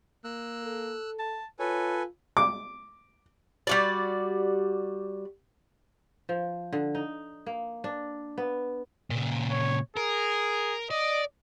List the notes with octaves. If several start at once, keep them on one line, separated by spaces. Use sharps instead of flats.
A#3 E6 F#6
A4
A5
F4 A4 B4 C#5 G#5
D6
G3 F#4 D5
F3
D3
D#4
A#3
D4
B3
A#2 C#3
C#5
G#4 A#4
D5 D#5